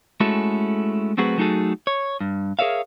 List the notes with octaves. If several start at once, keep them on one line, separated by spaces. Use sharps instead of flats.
G#3 A3 C#4 E4 F#4 A4
F#3 A3 C4 F#4 G#4 B4
F#3 A3 D#4 F#4 G#4 A4
C#5
G2
G#4 A#4 C#5 E5 F5